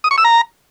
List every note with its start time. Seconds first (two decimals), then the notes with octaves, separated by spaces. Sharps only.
0.04 D#6
0.11 C#6
0.18 E6
0.25 A#5